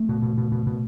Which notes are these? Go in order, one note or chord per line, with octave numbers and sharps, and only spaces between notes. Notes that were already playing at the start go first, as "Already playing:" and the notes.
Already playing: A3
B2
B2
B2
B2
B2